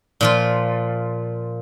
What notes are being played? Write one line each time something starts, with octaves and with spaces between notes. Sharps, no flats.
A#2 F3 F4